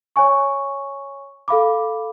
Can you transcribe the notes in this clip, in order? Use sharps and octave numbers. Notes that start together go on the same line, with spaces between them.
C#5 G#5 C#6
A4 F5 B5 D6